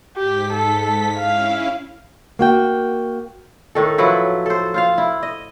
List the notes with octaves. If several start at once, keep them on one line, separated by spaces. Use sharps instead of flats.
G#2 G4 B6
A4
C#4 E4 F5
A#3 F#4 G5
A2 D#3 A4
F3 F#3 E4 B4
A4 C5
F4 C5 F5
E4
D#5